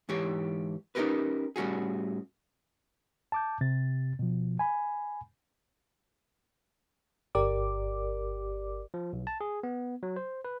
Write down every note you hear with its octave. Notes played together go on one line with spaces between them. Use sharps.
G#2 E3 G4 C#5
C#4 D#4 F#4 G4 A#4 B4
A2 G3 C#4 F#4 G#4
A5 D6 G6
C3 A6
B2 F3
G#5 B5
G1 G4 A#4 D5 D6
F3
B1
A5
G#4
B3
F#3
C5
B4